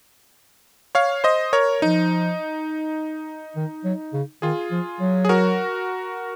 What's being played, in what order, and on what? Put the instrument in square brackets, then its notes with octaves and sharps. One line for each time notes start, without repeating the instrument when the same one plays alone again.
[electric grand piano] C#5 F5
C5 D#5
A#4 C#5
[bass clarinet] F3 [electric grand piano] D#4
[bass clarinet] D#3
F#3
C#3
[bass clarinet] D#3 [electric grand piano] F4 G#4
[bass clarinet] F3
F#3
[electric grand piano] G#4
F#4 A#4